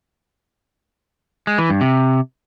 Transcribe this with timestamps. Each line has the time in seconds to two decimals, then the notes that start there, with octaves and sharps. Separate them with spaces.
1.47 G#3
1.58 E3
1.70 G2
1.81 C3